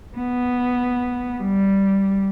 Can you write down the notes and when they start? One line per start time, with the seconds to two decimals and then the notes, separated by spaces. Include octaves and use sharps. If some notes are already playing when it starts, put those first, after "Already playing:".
0.18 B3
1.42 G3